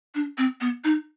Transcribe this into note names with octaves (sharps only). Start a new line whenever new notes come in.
D4
C4
B3
D#4